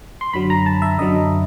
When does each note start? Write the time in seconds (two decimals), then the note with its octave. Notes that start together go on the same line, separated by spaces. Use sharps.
0.21 C6
0.33 F#2 D3 F#3 B5
0.50 A#5
0.66 A5
0.82 E5
0.98 F#2 D3 F#3 D#5